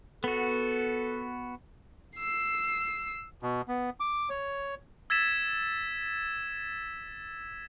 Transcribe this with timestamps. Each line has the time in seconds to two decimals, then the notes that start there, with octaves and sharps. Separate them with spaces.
0.24 B3 F#4 A4
2.17 E6 C7
3.42 B2
3.68 B3
4.00 D6
4.30 C#5
5.10 E6 G#6 A6 B6 E7